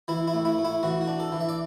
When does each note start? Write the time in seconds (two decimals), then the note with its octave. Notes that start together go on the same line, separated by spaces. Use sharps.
0.08 E3 E4
0.27 E4
0.34 A2
0.45 E4
0.58 A2
0.65 E4
0.83 E3 F#4
1.01 F#4
1.08 D4
1.20 A4
1.32 E3
1.40 E5
1.49 D5